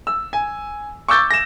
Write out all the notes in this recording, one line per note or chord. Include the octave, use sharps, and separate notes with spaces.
E6
G#5
C#6 D6 E6 G6 A6
A#6 E7